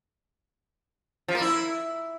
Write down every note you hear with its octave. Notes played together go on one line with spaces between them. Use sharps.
F3
A#3
E4